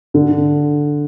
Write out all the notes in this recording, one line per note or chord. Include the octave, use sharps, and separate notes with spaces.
D3